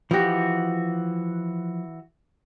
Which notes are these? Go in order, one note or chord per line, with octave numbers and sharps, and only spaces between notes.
E3 F3 F#4 G4